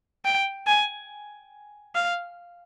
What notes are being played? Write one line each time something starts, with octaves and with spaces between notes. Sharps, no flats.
G5
G#5
F5